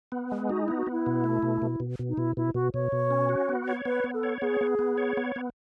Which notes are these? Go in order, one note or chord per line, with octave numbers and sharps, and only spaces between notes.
B3
G#3
D#4 F#4
B3 E4
F#4
B3 E4
B2
A3
B2
B2
B2
B2
D#4
B2 E4
B2 E4
B2 F#4
B2 C#5
B2
C#4
F#4
B3
C#5
B3 B4
B3
A4
C#5
B3 G#4
B3
B3
C#5
B3
B3